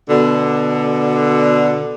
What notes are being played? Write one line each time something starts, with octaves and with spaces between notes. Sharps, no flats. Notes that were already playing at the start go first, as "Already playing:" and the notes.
B2 D3